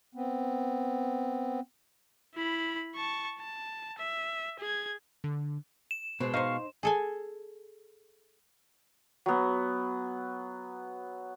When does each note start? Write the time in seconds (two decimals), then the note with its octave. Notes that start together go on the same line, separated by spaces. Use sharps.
0.15 B3 C4
2.35 E4 B5
2.96 A5 C#6
3.40 A5
3.98 E5
4.60 G#4 G#6
5.24 D3
5.91 E7
6.20 B2 G#3 C4
6.34 D#4 C5 F5 C#6
6.83 G#4 A4 G#5
9.26 F#3 B3